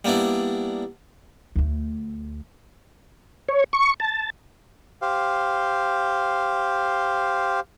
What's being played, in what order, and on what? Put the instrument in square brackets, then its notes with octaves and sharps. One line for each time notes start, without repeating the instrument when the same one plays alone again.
[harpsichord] G3 A#3 B3 D4 E4
[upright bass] D2 A3
[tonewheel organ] C#5
C#6
A5
[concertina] G4 C5 F5